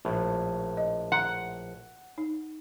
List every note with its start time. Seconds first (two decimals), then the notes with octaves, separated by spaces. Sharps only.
0.05 A#1 A2
0.77 D#5
1.12 F#5 A#5 C6
2.18 D#4